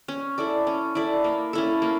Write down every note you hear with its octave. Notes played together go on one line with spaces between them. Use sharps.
C#4
E4 A4 D5
C#4
E4 A4 D5
A#3
C#4 E4 A4
A#3